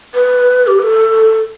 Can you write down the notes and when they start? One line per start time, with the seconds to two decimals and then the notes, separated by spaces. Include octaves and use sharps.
0.14 B4
0.67 G4
0.79 B4
0.83 A4